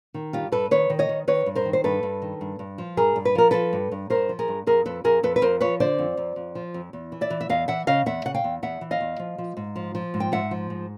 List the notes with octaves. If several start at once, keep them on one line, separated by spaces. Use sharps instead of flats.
D#3
G2 F4 G4
G2 A4 B4
D#3 B4 C#5
D#3
C#5 D#5
D#3
D#3 B4 C#5
G2
A#4 C5
D#3
C5
G2 A4 B4
G2
D#3
G2
G2
F3
G2 G#4 A#4
G2
B4
F3 A#4
F3 A4 B4
G2
G2
G2 A#4 C5
F3
G#4 A#4
G2
F2 G#4 A#4
F2 A4 B4
F2 G#4 A#4
F2 A4 B4
B4
F2 A#4 C5
F3 B4 C#5
D3 C5 D5
F2
F2
F2
F3
F2
E2
E3
D5 E5
E3
E5
E2 D#5 F5
E3 E5 F#5
C#3 D#5 F5
E2 E5 F#5
C#3 F#5
F5 G5
E2
E2 E5 F#5
E3
D#5 F5
E2
F3
F3
G#2
F3
F3
G#2
G5
G#2 E5 F#5
F3
G#2